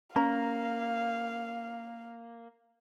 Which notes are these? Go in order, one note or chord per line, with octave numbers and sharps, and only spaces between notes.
A#3 C#4 F5 A#5